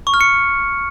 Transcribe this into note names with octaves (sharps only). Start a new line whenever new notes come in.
C#6
F6
C#7